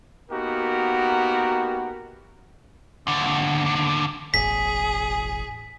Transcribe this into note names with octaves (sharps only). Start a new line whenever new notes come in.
A#3 B3 D#4 F#4 G4 A#4
D#2 D3
E1 A1 G#4 B6